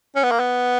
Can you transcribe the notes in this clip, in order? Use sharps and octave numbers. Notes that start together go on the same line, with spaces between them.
C#4
B3
A#3
B3